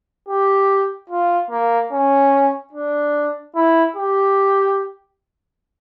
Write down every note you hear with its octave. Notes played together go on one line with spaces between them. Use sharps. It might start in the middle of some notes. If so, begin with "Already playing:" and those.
G4
F4
A#3
C#4
D4
E4
G4